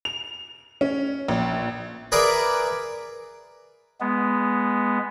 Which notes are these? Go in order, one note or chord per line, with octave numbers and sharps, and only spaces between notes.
F7
C#4
A#1
G#4 A#4 B4 D5 E5
G#3 B3